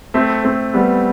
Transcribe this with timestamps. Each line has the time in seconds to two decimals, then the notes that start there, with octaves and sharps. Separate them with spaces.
0.14 A3 C4
0.44 A3 C4
0.74 G3 B3